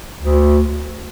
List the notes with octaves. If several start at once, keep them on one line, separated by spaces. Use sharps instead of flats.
D2